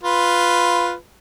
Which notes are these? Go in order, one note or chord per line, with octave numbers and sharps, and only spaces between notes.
F4 B4